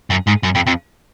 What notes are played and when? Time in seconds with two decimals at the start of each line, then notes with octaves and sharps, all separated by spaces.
0.11 F#2
0.28 G#2
0.44 F#2
0.56 F2
0.67 F2